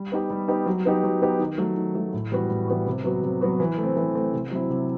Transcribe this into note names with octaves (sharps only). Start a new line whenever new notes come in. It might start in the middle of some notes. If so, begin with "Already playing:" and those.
Already playing: G3
B3 D#4 G4
G3
B3 D#4 G4
F#3
B3 D#4 G4
F#3
B3 D#4 G4
D#3
F#3 A3
D#3
F#3 A3
A2
E3 G3 B3 F#4
A2
E3 G3 B3 F#4
C3
F#3 B3 F#4
C3
F#3 B3 F#4
E3
A3
C4
E3
A3 C4
C3
F#3 C4 E4
C3